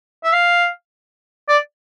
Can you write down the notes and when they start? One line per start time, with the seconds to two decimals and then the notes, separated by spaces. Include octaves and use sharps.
0.24 E5
0.33 F5
1.49 D5